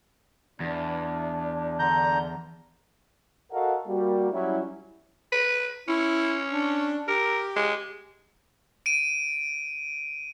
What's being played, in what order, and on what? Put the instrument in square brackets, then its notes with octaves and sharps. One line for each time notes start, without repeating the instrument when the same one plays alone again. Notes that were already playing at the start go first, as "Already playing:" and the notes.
[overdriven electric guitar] E2 [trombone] D4
[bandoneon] D3 A#5 G6
[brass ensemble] F#4 A4 A#4 D#5 F5 F#5
G3 A#3 F#4
F#3 G3 C#4 E4
[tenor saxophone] B4
[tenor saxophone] C#4 [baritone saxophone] E4
[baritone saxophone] D4
[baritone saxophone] G4 [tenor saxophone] A#4
[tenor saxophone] G#3
[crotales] D7 D#7